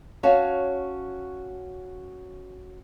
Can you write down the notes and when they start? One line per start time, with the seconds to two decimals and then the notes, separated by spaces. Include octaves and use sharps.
0.23 C#4 F#4 C#5 F5 A5